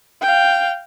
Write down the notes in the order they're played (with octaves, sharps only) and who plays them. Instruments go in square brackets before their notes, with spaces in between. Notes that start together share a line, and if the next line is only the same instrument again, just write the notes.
[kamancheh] F5 G5